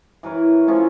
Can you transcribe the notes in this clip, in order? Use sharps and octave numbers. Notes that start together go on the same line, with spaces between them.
E3 A#4 B4 C#5
F3 A3 C#4 C#6